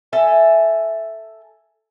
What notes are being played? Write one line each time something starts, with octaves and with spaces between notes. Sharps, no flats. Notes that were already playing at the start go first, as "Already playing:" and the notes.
A4 E5 G#5